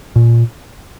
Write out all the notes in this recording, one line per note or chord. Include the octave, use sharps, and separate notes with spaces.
A#2